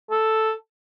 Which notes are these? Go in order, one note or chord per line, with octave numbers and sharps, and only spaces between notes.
A4